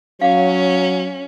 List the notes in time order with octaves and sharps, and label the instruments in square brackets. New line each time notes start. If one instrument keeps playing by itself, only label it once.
[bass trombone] F#3 [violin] C#4 [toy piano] F5 F#5